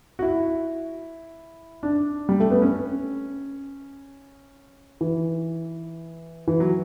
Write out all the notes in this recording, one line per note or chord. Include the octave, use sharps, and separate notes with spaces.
F#4
E4
D4
G3
A3
B3
C#4
E3
E3
F#3